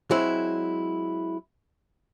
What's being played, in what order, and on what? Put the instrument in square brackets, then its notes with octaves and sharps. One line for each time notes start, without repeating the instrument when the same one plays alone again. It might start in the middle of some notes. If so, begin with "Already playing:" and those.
[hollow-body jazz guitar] F#3 G#3 C4 E4